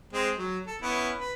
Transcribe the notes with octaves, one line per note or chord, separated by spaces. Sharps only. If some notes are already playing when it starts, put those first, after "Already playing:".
G#3 C4
F#3
A4
B3 C#4 E4
B4